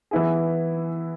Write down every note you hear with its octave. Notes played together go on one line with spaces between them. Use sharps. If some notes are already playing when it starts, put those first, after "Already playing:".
E3 B3 E4 G#4